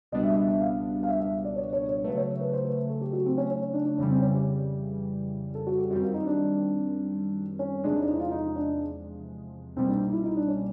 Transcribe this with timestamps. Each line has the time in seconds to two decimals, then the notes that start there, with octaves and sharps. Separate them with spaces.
0.12 C#2 B2 G3 B3 D4 D#5
0.24 E5
0.35 E5
0.48 E5
0.60 F5
1.03 F5
1.08 E5
1.20 E5
1.45 D5
1.56 C#5
1.73 C#5
1.89 C#5
2.04 C#3 F#3 A3 B4
2.17 C#5
2.41 B4
2.53 C5
2.65 B4
2.89 A4
3.01 G4
3.13 F#4
3.26 C4
3.38 C#4
3.50 C#4
3.61 C#4
3.73 D4
3.85 D4
3.98 F2 C#3 E3 G3 C#4
4.10 C4
4.22 C#4
4.34 G4
5.55 A4
5.67 F#4
5.78 G4
5.90 F#2 D#3 G3 C4 F#4
6.02 F4
6.14 D#4
6.27 D4
7.59 C#4
7.83 E2 C3 F3 G#3 D4
7.96 D#4
8.02 D4
8.08 D#4
8.14 E4
8.20 F4
8.31 D#4
8.56 D4
9.76 C2 B2 G3 A#3 C4
9.89 D4
10.01 D#4
10.13 E4
10.24 D#4
10.37 D4
10.48 C#4